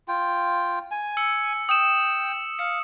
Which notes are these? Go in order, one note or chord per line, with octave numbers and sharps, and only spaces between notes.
F4 G5
G#5
E6 C#7
G5 D#6 E7
F5 C#7